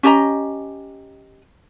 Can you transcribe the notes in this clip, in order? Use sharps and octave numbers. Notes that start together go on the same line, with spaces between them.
C#4 G4 D#5 A#5